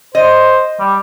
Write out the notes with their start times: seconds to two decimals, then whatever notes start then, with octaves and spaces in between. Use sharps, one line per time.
0.15 C5 D#5
0.80 G3